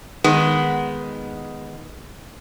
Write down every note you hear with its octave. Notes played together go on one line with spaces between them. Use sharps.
D#3 G#3 B3